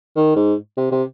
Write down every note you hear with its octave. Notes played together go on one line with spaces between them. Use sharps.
D#3
G#2
C3
C3